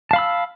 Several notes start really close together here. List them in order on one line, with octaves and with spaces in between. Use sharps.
A5 F5 B5 E6